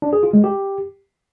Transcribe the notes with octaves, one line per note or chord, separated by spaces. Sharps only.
D4
G#4
F4
G#3
G4